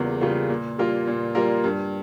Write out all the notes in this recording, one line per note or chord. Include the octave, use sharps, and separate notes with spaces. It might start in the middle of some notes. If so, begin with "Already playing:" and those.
Already playing: E2 C#3 G3 A#3 F4
C#3 G3 A#3 F4
A#2
G3 A#3 F4 A#4
A#2
G3 A#3 F4 A#4
G2